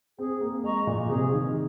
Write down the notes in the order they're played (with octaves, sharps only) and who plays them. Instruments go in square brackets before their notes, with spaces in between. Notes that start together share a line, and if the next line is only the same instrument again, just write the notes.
[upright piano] C4 [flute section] G#4
[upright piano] A#3
[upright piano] G#3 [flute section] D#5 A#5 C#6
[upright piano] A#2
[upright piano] C3 [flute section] G#4
[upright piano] D#3